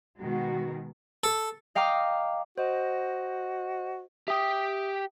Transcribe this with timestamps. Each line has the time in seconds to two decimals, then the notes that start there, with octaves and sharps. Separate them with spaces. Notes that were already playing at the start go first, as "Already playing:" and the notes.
0.20 B2 D#3 G#3 F#4
1.24 A4
1.75 D#5 F5 G5 A#5 D6
2.58 F#4 C5 D#5
4.28 G4 E5 G5 D#6